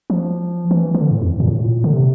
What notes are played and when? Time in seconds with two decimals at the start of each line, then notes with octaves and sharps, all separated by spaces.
0.10 F3
0.71 E3
0.94 E3
1.01 D3
1.11 A2
1.22 F2
1.40 A#2
1.48 A2
1.63 A#2
1.84 D3
1.93 C3